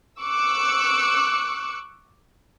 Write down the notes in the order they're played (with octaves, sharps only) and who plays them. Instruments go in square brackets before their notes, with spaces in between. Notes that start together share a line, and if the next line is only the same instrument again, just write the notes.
[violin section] C#6 D6 E6 F#6 C#7